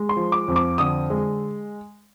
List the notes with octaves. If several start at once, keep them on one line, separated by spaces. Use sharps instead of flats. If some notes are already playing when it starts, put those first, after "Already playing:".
Already playing: G#3
C6
F3
D6
F2
D6
D3 D#6
G#3